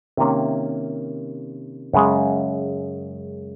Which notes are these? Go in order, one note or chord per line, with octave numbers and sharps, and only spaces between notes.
C3 D#3 A#3 C#4
F#2 C#3 G#3